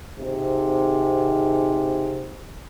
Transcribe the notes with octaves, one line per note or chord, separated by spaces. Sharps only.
G#1 G#2 C3